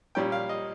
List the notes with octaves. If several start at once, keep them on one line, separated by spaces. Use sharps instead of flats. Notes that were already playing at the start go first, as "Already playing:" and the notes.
A#2 G3 C#4 G5
F5
D#5